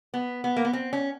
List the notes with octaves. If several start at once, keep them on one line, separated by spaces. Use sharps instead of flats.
B3
B3
A#3
B3
C4
C#4